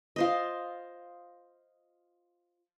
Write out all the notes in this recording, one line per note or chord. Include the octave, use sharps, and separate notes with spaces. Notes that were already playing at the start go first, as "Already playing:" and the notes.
F4 C5 D#5